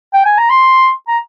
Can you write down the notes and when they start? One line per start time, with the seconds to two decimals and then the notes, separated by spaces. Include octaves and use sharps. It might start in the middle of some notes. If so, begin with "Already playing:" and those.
0.14 G5
0.25 G#5
0.38 A#5
0.50 C6
1.08 A#5